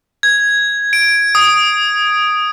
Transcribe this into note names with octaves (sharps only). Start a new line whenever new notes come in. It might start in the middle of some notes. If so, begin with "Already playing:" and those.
G#6
D7
D#6